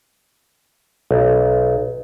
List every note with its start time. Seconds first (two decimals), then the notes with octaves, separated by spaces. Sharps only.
1.11 B1